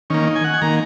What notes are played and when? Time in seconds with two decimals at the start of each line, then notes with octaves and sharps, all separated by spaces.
0.10 D#3 A#3 C#4
0.27 D#4
0.36 G#5
0.44 F#5
0.54 G#5
0.62 D#3 A#3 A#5